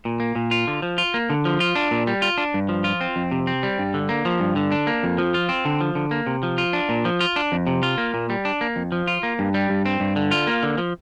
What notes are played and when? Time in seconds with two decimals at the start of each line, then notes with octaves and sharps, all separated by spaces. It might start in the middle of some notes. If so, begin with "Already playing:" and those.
0.05 A#2
0.20 A#3
0.36 A#2
0.51 F4
0.67 D3
0.82 F3
0.98 F4
1.14 A#3
1.30 D3
1.45 F3
1.60 F4
1.75 D4
1.91 A#2
2.07 G3
2.22 F4
2.38 D4
2.54 G2
2.69 F3
2.84 F4
3.01 C4
3.16 F2
3.31 C3
3.47 C4
3.63 G3
3.79 G2
3.94 D3
4.09 A#3
4.25 F3
4.40 G2
4.56 D3
4.72 D4
4.87 A#3
5.03 F2
5.18 F3
5.34 F4
5.49 C4
5.65 D3
5.81 F3
5.95 D3
6.11 A#3
6.27 C3
6.43 F3
6.58 F4
6.73 D4
6.89 A#2
7.05 F3
7.21 F4
7.36 D4
7.52 F2
7.67 C3
7.83 F4
7.98 A#3
8.14 A#2
8.30 G3
8.45 D4
8.61 A#3
8.76 F2
8.92 F3
9.07 F4
9.23 A#3
9.39 G2
9.54 G3
9.70 G2
9.86 C4
10.00 G2
10.16 D3
10.31 F4
10.47 A#3
10.63 D3
10.78 F3